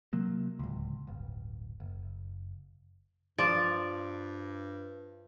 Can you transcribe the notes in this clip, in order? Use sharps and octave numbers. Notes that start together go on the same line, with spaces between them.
C3 F#3 A#3
D1 C#2
D1 G1
F#1
G2 F3 D5